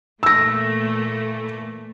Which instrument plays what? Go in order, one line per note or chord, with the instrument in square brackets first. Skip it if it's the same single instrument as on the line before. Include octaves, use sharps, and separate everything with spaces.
[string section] A#2 E3 A3 [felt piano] E6 A#6